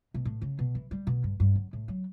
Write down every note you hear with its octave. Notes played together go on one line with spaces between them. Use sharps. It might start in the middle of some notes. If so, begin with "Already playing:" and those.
B2
A2
C#3
B2
E3
G3
B2
G2
G2
F#2
A2
F#3